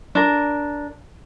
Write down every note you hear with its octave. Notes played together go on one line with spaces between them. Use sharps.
D4 A#4